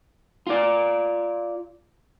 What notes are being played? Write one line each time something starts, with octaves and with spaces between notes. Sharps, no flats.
F4 D5